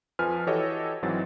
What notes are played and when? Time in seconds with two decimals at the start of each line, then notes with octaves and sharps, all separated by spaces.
0.19 F2 F3 B4 G#5 F6
0.47 E3 F#4 G4 A4 C#5 D#5
1.02 G#1 G#2 E3 F#3 C4 A6